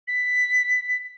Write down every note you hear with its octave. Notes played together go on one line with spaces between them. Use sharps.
B6